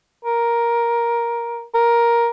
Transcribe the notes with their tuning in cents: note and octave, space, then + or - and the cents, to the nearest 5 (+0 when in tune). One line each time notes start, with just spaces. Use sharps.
A#4 +10
A#4 +10